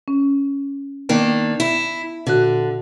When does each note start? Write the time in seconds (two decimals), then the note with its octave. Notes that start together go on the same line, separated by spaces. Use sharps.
0.08 C#4
1.09 D#3 A#3 B3 D4
1.60 E4
2.27 A#2 D3 F#4 F#6